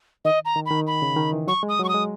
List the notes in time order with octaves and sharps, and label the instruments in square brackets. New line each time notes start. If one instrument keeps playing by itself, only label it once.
[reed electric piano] D#3 [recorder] D#5
[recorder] A#5
[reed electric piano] D#3
[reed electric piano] D#3 [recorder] B5
[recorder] B5
[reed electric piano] C#3
D#3
E3
[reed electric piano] F#3 [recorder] C#6
[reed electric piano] G#3
[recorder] D#6
[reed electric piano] F#3
[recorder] C#6
D#6
[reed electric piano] G#3